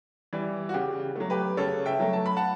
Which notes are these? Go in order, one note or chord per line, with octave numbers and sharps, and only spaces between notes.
E3 G3
F#4
C#3 G4
F#3 A3
G4 B4
C#3 A4 C#5
E5 G5
F#3 A3
A5
B5
F#5 A5